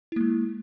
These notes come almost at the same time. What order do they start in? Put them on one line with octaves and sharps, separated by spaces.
E4 A#3 G#3